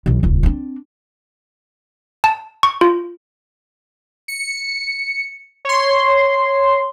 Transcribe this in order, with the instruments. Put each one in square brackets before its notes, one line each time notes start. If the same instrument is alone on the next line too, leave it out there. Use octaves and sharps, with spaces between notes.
[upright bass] B1 E2
D#1 C#2
C4 D4
[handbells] A5
C#6
F4
[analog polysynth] C#7
C#5 C6